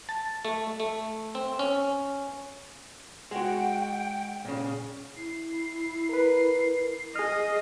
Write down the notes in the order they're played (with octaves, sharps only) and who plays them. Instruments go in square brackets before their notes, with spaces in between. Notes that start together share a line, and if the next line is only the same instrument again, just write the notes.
[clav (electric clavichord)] A5
A3
A3
C4
C#4
[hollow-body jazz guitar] G#3 F#4 [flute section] F#5 G5
[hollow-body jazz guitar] A#2 C#3
[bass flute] E4 [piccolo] C7
[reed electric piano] A#4 B4
[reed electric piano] G#4 F6 [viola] D#5